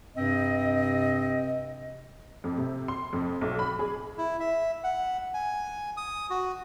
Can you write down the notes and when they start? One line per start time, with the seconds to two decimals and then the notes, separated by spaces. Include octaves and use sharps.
0.16 G2 C3 C4 D#5
2.44 F2
2.58 C3
2.88 C6
3.13 F2
3.41 B1
3.59 B5
3.79 G#4
4.18 E4
4.40 E5
4.84 F#5
5.34 G#5
5.97 D#6
6.30 F#4